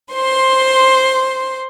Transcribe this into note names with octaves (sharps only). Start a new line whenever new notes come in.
C5 C6